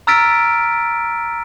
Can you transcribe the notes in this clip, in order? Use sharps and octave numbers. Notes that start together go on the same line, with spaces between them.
A#5 E6 F6 A6 B6 D7